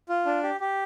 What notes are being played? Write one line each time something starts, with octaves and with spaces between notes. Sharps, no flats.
F4
D4
G4
G4